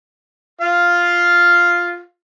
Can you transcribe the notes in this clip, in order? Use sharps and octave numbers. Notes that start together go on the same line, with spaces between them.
F4 F5